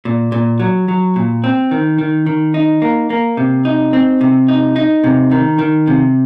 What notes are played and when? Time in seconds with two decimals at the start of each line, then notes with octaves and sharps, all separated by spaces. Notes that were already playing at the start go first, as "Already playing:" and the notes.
0.05 A#2
0.32 A#2
0.60 F#3
0.88 F#3
1.16 A#2
1.44 C4
1.71 D#3
1.98 D#3
2.26 D#3
2.54 D#4
2.82 A#3
3.10 A#3
3.37 C3
3.65 D#4
3.93 C4
4.21 C3
4.48 D#4
4.76 D#4
5.04 C3
5.31 D#3
5.59 D#3
5.88 C3